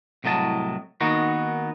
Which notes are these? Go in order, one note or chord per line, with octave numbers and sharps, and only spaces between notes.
C2 A2 F#3 D#5 A5
D#3 A#3 B3 D#4 F#4